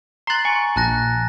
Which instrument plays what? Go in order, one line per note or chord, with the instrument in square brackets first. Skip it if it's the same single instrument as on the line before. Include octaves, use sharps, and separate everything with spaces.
[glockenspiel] A#5 A6 [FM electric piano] C6 F#6
[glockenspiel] G#5 [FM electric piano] C#6
[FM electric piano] A#1 [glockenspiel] A5 F#6 A#6